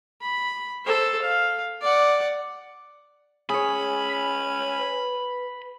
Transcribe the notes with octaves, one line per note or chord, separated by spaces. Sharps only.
B5
A4 C5
F5
D5 F#5
C#4 G#4 C#5 B5
B4